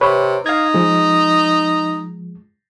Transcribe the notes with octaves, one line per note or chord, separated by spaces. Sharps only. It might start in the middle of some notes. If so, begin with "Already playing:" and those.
C3 B4 C#5
D#4 F5 G#6
F3 G#3